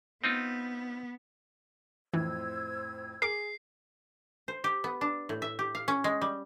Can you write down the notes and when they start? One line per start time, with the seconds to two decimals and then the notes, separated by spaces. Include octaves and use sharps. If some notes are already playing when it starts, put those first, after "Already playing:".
0.24 B3 C4 D#4 F4
2.14 F2 A2 E3 C5 E6 G#6
3.22 G#4 A#4 D6 C7
4.48 C5
4.64 G4
4.84 B3
5.01 D4
5.29 A2
5.42 E5
5.59 G4
5.75 F5
5.88 C#4
6.04 G#3
6.21 G3